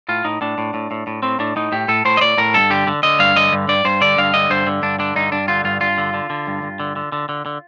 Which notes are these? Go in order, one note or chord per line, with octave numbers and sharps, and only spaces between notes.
A2 F4
A2 D#4
A2 D4
A2
A2
A2
A2
A2 C4
A2 D4
A2 D#4
A2 G4
A2 A4
A2 C5
D#5
A2 D5
A2 A#4
G2 A4
D3 G4
D3
D3 D#5
G2 F5
D3 D#5
G2
G2 D5
G2 C5
D3 D5
G2 F5
D3 D#5
G2 C5
D3
G2 D4
D3 D4
G2 D#4
G2 D4
D3 F4
G2 F4
G2 F4
D3
D3
D3
G2
G2
D3
D3
D3
D3
D3